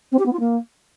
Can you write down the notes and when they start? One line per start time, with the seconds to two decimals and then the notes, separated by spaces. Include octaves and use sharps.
0.12 C4
0.19 G4
0.26 B3
0.33 F4
0.40 A#3